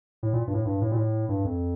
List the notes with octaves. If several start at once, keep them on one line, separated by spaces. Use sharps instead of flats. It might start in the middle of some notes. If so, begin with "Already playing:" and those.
A2
A#2
G2
A2
G2
A2
A#2
A2
G2
F2